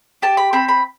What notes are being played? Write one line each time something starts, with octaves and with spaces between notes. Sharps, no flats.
G4 A5
B5
C4 B5
B5